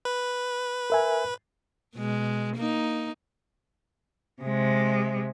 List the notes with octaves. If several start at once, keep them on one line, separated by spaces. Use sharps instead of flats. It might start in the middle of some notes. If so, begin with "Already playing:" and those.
B4
A#4 E5 G#5
B2 G#3
A#3 D#4
C3 G#3